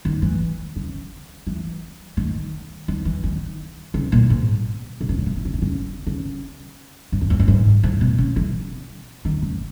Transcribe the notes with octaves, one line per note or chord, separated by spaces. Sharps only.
D#3
E3
C#3
E3
D#3
D#3
E3
D#3
C#3
A#2
G#2
B2
C#3
D#3
E3
D#3
C#3
D#3
C#3
C#3
G#2
F#2
E2
F#2
G#2
G#2
B2
C#3
E3
D#3
C#3